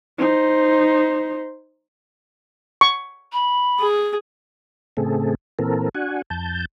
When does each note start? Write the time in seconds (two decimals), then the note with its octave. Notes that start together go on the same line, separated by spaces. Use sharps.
0.18 D#4 C5
2.81 C#6
3.33 B5
3.79 G#4
4.97 A2 C#3 A3 C4 G#4 A4
5.59 A#2 E3 C4 A4 A#4
5.95 D4 F#4 F#5 G#5
6.30 F2 A5 G6